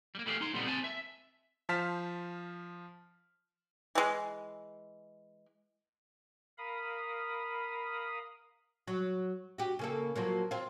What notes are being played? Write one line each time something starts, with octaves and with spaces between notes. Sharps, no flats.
G3 A#3
G3 A3 E4 G4 G#4 F5
D#4 C6
A#2 D3 G3 B3 C4 D#4
C4 G#5 A5
E5
F3 C5 F5 A5 F6 B6
E3 G#3
A#4 F5 B5 D#6
F#3
F#4 G4
C#3 A#3 A4
F3 F#3 A#3
C4 F4